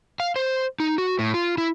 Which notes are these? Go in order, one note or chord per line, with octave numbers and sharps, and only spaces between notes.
F5
C5
D#4
F#4
A2
F4
E4